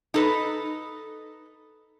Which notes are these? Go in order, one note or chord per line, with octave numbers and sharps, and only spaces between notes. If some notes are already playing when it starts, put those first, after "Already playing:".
D#4 A4 B4